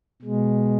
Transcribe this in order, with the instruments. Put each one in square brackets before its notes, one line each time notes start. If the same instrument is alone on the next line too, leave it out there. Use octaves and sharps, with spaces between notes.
[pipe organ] B2 G#3